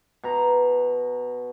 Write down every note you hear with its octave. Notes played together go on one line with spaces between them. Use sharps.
B2 A#5